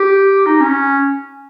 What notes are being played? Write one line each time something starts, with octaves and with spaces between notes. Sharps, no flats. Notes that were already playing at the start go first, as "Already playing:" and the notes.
Already playing: G4
D#4
C#4